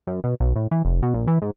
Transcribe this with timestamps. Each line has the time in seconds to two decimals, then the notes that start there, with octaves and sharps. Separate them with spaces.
0.07 F#2
0.24 B2
0.40 B1
0.56 A2
0.71 E3
0.85 F1
1.02 B2
1.14 A#1
1.27 E3
1.42 G#2